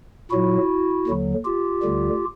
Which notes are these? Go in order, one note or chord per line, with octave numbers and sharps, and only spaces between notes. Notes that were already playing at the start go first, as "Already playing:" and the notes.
A#2 F#3 E4 F#4
D#2 D3 F#3
F4 G4
D2 D3 G3